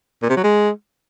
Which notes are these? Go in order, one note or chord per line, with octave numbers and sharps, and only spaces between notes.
A#2
C3
F#3
G#3